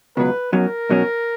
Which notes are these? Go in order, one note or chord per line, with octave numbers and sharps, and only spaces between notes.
C#2 B2 F#3 B4
B1 B2 F#3 C#4 A#4
B1 B2 F#3 C#4